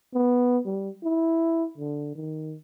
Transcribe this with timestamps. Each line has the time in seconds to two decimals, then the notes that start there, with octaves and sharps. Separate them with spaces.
0.14 B3
0.66 G3
1.04 E4
1.78 D3
2.16 D#3